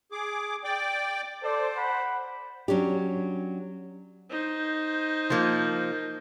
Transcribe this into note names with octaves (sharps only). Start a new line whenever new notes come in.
G#4 D6
D5 G5 D6
A4 C5 D5
F#5 B5
F#3 C#4 D4 G4
D#4 C5
F3 A#3